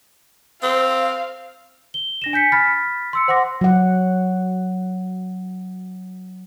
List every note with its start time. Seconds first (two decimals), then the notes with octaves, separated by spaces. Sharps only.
0.63 C4 F5
1.94 G7
2.22 D4 A#6 E7
2.33 G#5 G6 B6 C#7
2.52 B5 F6 A6 B6
3.13 C6 E6 C#7
3.28 C5 F#5 C6 D6 A#6
3.61 F#3 F#5